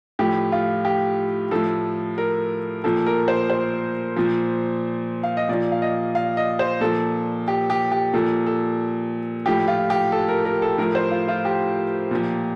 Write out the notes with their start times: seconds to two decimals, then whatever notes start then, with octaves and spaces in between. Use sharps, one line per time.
0.19 A2 F3 G4
0.52 F4
0.85 G4
1.51 A2 F3 A4
2.18 A#4
2.84 A#2 F3 A4
3.06 A#4
3.28 C5
3.50 C5
4.16 A#2 F3
5.23 F5
5.37 D#5
5.49 A#2 F3 D5
5.72 F5
5.82 D#5
6.15 F5
6.37 D#5
6.59 C5
6.81 A#2 F3 A4
7.48 G4
7.70 G4
7.92 G4
8.14 A#2 F3 A4
8.46 A4
9.46 A2 F3 G4
9.68 F4
9.90 G4
10.12 A4
10.28 A#4
10.45 A#4
10.62 A4
10.78 A2 F3 A#4
10.95 C5
11.11 F4
11.28 F4
11.45 G4
12.11 A#2 F3